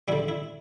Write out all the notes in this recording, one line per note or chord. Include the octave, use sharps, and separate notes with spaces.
D3 G3 E4
E4